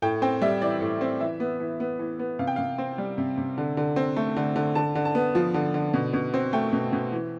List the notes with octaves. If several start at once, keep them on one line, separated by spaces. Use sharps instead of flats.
A2 G5
C4 G5
G3 E5
E3 D5
A2
C4
E3 E5
B3
E3
B3
E3
B3
C3 F5
G5
C3 F5
C4
G3
C3
C3
D3
D3
C4
A3
D3
D3
D3 A5
D3
A5
B3
F3
D3
D3
B2
B2
C4
A3 G5
B2
B2
E3